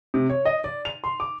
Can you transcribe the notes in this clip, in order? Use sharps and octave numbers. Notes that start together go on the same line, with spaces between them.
C3
C#5
D#5
D5
F7
C6
D6